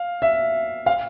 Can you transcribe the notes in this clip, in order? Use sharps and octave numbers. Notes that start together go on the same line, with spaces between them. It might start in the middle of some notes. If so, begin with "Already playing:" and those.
Already playing: F5
E5
F5